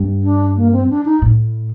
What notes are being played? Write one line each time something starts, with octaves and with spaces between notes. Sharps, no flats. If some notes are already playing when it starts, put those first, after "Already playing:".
Already playing: G2
D4
A#3
C4
D4
D#4
A2